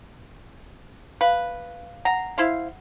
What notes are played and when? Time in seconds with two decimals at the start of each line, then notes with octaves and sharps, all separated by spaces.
1.21 B4 F5
2.05 F#5 A#5
2.38 E4 C5 F5